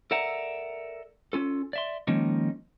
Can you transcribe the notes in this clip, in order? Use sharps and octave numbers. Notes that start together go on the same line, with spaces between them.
A4 A#4 D5 E5 F#5 A#5
C#4 F4 A4
D5 E5 C6
D#3 F3 G#3 A#3 C#4 D#4